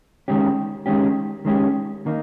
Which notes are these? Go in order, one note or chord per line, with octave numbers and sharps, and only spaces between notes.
D#3 G#3 C#4 G4
D#3 G#3 C#4 G4
D#3 G#3 C#4 G4
D#3 A#3 D#4